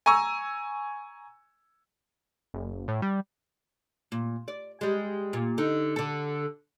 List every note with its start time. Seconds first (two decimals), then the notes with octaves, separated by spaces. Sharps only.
0.06 G#5 A#5 C#6 E6
2.54 F#1
2.88 A2
3.02 G3
4.12 A#2
4.48 D5
4.81 G3 G#3
5.33 A#2
5.58 D3 D#4
5.96 D3 A4